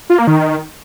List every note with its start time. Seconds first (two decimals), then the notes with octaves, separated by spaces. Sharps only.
0.10 F4
0.18 A#3
0.27 D#3